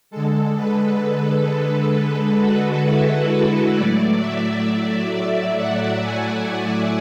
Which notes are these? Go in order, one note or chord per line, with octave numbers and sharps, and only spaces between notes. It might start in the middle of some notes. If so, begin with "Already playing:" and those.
D3 G#3 A4
B4
B4
A4
F#4
E4
F#4
A2 F#3 A3 D5
E5
E5
E5
F#5
G#5
G#5